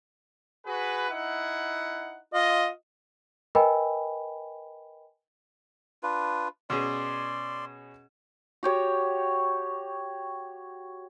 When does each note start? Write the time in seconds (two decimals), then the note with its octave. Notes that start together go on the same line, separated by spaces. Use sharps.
0.66 F#4 G#4 B4
1.10 D#4 E4 F#5
2.34 F4 D#5
3.55 A#4 B4 D#5 G5 G#5 B5
6.03 D4 F4 B4
6.70 B2 C#4 G#4 D5 C6
8.63 F#4 G4 C#5